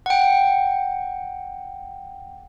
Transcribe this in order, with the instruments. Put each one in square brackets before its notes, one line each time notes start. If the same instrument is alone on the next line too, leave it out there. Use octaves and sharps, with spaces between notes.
[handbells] F#5 G5